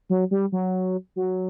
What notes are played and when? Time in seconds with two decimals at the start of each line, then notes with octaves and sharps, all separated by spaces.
0.10 F#3
0.31 G3
0.52 F#3
1.16 F#3